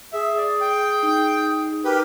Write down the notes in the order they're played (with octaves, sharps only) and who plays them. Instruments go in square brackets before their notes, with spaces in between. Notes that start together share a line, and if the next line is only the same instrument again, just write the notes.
[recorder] G#4 [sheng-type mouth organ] E5
[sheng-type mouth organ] D5
G5
[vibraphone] D#4
[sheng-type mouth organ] G4 B4 [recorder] A#4